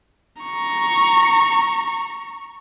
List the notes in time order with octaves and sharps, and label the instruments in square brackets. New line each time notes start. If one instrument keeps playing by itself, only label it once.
[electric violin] A#5 C#6